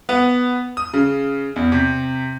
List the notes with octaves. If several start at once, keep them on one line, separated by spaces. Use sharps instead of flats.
B3
D#6
C#3
E2
C3